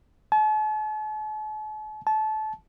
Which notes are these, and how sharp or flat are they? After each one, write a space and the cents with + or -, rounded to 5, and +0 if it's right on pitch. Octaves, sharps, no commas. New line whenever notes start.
A5 -45
A5 -25